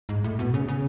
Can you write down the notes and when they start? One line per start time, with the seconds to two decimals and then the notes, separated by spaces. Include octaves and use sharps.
0.09 G#2
0.24 A2
0.39 B2
0.54 C#3
0.68 C#3